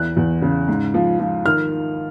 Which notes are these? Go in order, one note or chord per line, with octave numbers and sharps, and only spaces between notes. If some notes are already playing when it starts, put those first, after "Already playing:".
Already playing: E2 E3 F#6
E2
C#3
G#2
F3
F3
D#3 F6